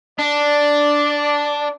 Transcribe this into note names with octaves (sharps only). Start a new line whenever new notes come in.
D4 D5